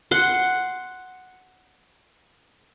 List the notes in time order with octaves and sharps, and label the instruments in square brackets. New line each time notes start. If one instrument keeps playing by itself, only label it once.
[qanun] F#5 C6